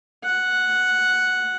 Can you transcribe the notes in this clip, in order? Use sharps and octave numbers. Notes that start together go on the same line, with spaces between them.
F#5